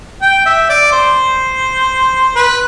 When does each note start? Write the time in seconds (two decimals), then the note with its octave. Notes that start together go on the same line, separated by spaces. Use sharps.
0.22 G5
0.46 E5
0.69 D5
0.92 C5
2.36 B4